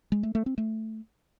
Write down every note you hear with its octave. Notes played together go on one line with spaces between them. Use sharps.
G#3
A3
A3
C4
A3